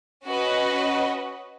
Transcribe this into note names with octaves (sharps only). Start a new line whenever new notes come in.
C#4 F#4 B4 D#5